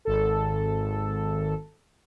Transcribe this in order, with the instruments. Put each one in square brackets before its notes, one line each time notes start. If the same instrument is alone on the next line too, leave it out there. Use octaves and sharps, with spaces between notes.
[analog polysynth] G#1 A4